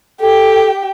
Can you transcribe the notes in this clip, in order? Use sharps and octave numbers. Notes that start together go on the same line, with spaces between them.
G4 A4 G5